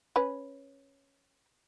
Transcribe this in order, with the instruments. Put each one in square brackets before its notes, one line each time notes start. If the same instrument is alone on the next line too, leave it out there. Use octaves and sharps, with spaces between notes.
[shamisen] C#4 B4